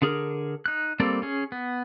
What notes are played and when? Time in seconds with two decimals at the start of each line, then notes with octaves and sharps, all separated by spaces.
0.02 D3 D4 G#4 A#4
0.66 D#4 F#6
1.00 G3 A#3 C4 A4 D5
1.22 C#4 G#4
1.52 B3